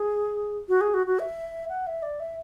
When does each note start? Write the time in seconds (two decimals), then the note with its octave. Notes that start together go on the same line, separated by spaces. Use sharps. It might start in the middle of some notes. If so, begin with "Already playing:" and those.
Already playing: G#4
0.69 F#4
0.81 G#4
0.94 F#4
1.07 F#4
1.19 E5
1.69 F#5
1.87 E5
2.03 D5
2.20 E5